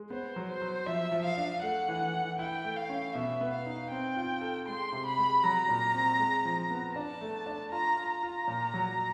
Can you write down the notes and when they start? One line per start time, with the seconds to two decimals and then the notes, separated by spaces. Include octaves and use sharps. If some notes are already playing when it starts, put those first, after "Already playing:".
Already playing: G#3
0.10 B3 C5
0.36 F#3
0.49 C5
0.62 F#3
0.86 F3 E5
1.12 F3
1.25 F5
1.37 D4
1.63 A3 F#5
1.89 E3
2.14 E3
2.39 E4 G5
2.65 A3
2.77 F5
2.89 C#4
3.15 B2 E5
3.41 B3
3.54 F5
3.66 D#4
3.91 C4 G5
4.17 F4
4.41 A4
4.68 G#3 C6
4.92 C3
5.06 B5
5.18 G#3
5.43 F#3 A#5
5.69 A#2
5.94 C4
6.19 G#3
6.45 F3
6.71 B3
6.96 D4 A5
7.21 A3
7.46 D4
7.71 F4 A#5
7.97 F4
8.10 A#5
8.23 F4
8.48 A#2
8.74 F#3